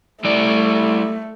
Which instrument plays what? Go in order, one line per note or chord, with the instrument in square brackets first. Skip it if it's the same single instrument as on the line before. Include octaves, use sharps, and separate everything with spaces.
[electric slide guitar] G3 E4 D5 [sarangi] A3